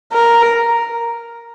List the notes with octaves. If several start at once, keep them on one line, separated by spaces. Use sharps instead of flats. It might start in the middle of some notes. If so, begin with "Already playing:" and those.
A#4